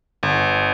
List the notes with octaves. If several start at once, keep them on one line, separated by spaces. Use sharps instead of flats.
G1